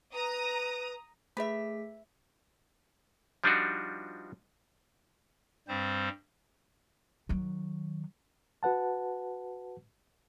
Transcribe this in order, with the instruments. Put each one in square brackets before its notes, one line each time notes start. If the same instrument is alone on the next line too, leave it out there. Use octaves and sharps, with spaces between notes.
[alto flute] B4 [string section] A#5 D#6
[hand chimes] A3 G#4 B6 [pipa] B4 E5
[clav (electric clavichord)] F3 G3 D4 D#4 F4 F#4
[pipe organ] G2 G3 C4 C5
[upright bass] D#3 F#3
[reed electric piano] F#4 B4 F#5 A5